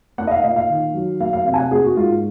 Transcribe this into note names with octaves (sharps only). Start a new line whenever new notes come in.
A#3 F#5
D#5
F5
A#2 D#5
F5
D#3
F#3
A#3 F5
F5
C3 F5
G#5
F#5
A#3 G#4
F#4
G#2 F4